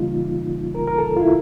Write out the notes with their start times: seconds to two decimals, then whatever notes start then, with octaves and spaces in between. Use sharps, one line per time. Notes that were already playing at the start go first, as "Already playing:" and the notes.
Already playing: C#3 E3 G3 A#3 D#4 F4
0.75 A#4
0.87 A#4
0.98 A4
1.17 F4
1.21 E4